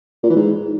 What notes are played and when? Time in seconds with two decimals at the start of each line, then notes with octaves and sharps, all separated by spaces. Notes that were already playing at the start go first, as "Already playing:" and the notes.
0.23 A#2
0.30 E3
0.36 G#2